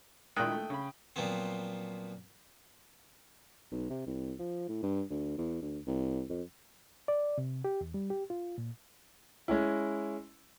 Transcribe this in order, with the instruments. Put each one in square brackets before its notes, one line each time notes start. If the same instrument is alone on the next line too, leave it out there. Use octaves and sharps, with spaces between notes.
[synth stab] A#2 D#3 [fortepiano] G#3 D4 E4 [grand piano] G5 D#6 F#6
[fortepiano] A3
C#3 B5
[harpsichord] A#2 F3 F#3 B3 C4
[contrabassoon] B1
C3
C2
F3
A2
G2
D2
E2
D2
C2
F2
[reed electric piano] D5
C3
G4
E2
G3
G4
F4
A#2
[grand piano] G#3 C#4 E4